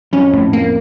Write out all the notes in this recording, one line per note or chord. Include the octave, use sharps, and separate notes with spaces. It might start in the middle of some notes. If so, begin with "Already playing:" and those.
F2 C#4
A2
A#3